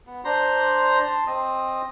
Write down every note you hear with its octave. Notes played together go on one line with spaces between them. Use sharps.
B3
D4 C5 A#5 C6
A5 C6
C4 D#5 D#6